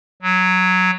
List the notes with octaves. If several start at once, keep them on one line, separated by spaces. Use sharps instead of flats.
F#3